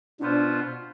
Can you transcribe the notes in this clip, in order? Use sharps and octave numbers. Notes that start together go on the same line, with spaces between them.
B2 B3 D4 F4 C5